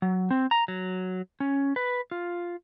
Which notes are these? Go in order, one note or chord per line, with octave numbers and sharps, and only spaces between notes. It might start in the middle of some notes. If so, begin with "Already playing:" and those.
F#3
C4
A#5
F#3
C#4
B4
F4